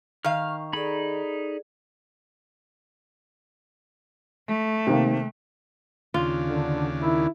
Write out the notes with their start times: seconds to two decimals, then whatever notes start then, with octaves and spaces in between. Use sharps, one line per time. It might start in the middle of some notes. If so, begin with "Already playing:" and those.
0.25 D#3 F5 F6
0.48 C#6
0.73 D#4 G#4 A4 D5 B5
4.48 A3
4.87 C3 D#3 A#3
6.14 D#2 C#3 D4 F4
6.49 D3
7.02 D#3 E4